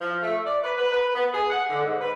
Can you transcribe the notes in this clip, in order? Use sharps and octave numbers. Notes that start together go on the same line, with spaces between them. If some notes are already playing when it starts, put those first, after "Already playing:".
F3
A3
D5
B4
B4
B4
B3
G#4
F#5
D3
G#2
B4